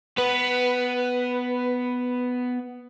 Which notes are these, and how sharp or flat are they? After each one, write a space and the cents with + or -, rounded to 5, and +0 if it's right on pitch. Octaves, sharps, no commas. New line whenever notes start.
B3 +10 B4 +0